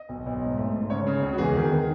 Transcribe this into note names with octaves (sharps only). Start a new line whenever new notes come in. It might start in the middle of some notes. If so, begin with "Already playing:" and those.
Already playing: D#5
B1
B1
G#2
A3
G#2
C#3 C#5
C#3
C#2
F#4
E2 G#4
D#3
D#3